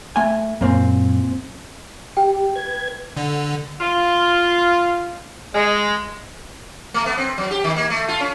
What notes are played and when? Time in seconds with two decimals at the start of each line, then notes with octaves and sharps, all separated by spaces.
0.16 A3 G#5
0.61 F#2 A#2 A#3 C4 C#4
2.17 G4 G5
2.55 B4 G#6
3.17 D3
3.80 F4
5.54 G#3
6.94 A3
7.06 B3
7.18 C4
7.38 F#3
7.51 G4
7.64 D#3
7.76 A#3
7.90 A3
8.08 F4
8.20 C#4